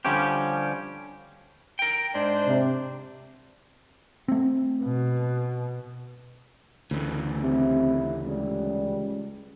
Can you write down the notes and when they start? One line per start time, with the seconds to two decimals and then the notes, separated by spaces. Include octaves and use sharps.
0.05 D3 F3 G3 C#4 G4
1.79 A#4 G5
2.15 G#2 D4 C5
2.47 C3
4.28 A3 C4
4.83 B2
6.91 D2 C#3 E3
7.43 C3 E4
8.26 C#2 G3